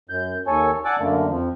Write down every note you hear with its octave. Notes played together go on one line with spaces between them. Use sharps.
F#2 G6
D#2 A4 C#5 G#5
D5 F#5 G#5 A5 D6 E6
F#2 D3 A3 A#3
F2 F3